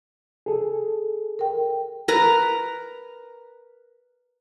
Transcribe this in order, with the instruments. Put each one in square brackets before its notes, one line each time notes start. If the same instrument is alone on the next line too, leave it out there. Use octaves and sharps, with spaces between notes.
[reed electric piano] G#4 A4
[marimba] A#4 G5
[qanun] A#4 B4 A#5